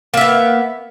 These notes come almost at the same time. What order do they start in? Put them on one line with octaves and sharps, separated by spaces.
A#3 E5 B3